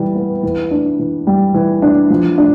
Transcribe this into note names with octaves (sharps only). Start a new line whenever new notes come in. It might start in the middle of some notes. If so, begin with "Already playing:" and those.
Already playing: E3 G3
B3
E3
D4
E3
G3
E3
D4
F3
D4